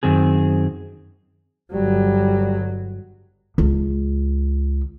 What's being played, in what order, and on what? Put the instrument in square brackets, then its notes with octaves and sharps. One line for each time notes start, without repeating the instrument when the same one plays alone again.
[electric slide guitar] F#2 D#3 C4 G#4
[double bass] G1 F#3 [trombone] G3
[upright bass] C#2